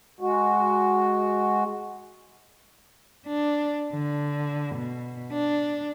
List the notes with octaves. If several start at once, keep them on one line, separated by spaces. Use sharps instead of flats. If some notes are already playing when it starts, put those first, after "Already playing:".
G#3 F#4
D4
D3
B2
D4